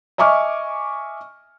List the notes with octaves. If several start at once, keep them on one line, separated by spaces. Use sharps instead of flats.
D#5 E5 G#5 C#6 D6 F6